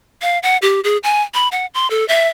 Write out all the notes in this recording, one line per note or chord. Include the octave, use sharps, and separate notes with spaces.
F5
F#5
G4
G#4
G#5
B5
F#5
C6
A4
E5